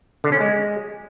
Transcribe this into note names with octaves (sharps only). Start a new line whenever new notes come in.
D3
C#4
G#3